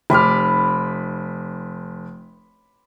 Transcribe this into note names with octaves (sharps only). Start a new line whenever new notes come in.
F1 B5 C6 D6 F6